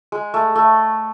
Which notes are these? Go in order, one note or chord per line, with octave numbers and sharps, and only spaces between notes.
G#3
A3
A3